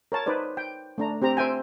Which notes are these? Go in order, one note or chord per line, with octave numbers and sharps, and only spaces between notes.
A#4 C#5 A5
D#4 B4 C5 D5
G5
A3 D4 A#5
C4 G4 C5 A#5
C5 E5 G5 G#5